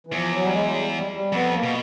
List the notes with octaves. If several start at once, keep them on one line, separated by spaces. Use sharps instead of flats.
E3
E2 F3
F#3
G3
G#3
G3
G3
G3
F2 B3
A#3
B2